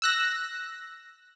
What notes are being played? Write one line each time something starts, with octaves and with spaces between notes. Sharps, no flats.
E6 F#6 A#6